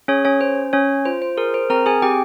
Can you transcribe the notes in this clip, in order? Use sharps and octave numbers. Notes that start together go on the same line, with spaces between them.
C#4 G#4 C#5
C#4 C#5
C#4 C5
C#4 C#5
F4 C5
C5
G#4 A#4
C5
C4 A#4 A#5
G#4 G#5
C4 G4 G5